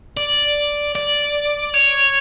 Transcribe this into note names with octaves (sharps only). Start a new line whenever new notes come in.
D5
D5
C#5